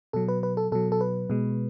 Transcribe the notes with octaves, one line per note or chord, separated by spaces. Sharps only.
B2 F#3 A4
B4
B4
A4
B2 F#3 A4
A4
B4
B2 G#3